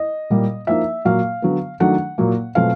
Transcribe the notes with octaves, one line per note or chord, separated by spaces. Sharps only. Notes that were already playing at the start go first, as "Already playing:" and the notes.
Already playing: D#5
A#2 G3 A#3
F3 A#3 D#4 E5
A#2 F#3 A#3 F5
D3 F#3 B3
D#3 F#3 A3 D4 F#5
A#2 F#3 A#3
B2 F#3 A3 C4 F4 F5